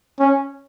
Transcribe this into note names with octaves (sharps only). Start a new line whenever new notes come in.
C#4